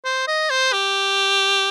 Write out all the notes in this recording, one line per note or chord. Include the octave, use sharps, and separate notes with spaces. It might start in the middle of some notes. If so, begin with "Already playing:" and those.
C5
D#5
C5
G4